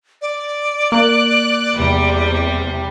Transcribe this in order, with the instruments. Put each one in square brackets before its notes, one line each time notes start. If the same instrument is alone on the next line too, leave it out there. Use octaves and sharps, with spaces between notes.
[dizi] D5
[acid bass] A#3 [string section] F#6
[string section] E2 C3 G3